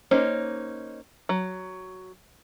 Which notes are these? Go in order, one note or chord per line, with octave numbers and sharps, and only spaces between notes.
A#3 C#4 D#4 C5
F#3